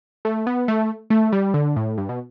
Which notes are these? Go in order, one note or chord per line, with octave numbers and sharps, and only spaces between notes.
A3
B3
A3
A3
G3
D3
A2
G2
B2